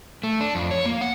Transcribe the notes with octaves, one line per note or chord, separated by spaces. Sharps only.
A3
D4
F2
C#5
A#3
F#5